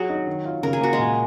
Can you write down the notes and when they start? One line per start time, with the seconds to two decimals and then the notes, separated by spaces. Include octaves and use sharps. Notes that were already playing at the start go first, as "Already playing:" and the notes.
Already playing: F#3 F#4 G#4
0.09 D#4
0.27 D#3
0.45 F4
0.63 C#3 A#4
0.73 G#4
0.81 A#3 F#4
0.93 G#3 G#4
0.99 A#2